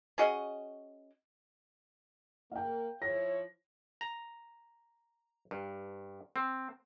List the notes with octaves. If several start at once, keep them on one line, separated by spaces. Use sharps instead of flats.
C#4 F#4 G#4 D#5
A#3 F5 G5
F3 E4 C#5 A#6
A#5
G2
C4